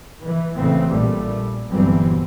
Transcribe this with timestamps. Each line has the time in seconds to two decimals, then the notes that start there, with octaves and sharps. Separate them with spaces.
0.23 E3
0.55 A1 C#3 E3 A3 C4
0.88 A#1 A#2 G3 A3
1.69 G1 C2 E3 F#3 G3 C4